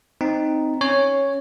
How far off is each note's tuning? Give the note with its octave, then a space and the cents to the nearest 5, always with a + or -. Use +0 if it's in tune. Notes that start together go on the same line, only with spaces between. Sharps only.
C4 +0 D#4 +0
C#4 -15 C#5 +0